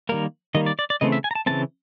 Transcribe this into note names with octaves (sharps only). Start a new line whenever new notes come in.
D#3 G3 A#3 A#4
D#3 G3 A#3 D#5
D5
D5
D5
C#3 E3 A3 C4 D#5
E5
G#5
A#5
A5
C#3 E3 A3 C4 A5